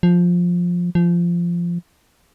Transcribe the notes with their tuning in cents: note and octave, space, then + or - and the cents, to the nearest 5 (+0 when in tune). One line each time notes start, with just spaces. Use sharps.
F3 +10
F3 -15